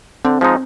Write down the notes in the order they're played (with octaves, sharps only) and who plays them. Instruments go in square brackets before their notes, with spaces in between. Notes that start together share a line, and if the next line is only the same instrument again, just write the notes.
[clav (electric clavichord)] D3 [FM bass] C4
[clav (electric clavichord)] F3 G#3 D#4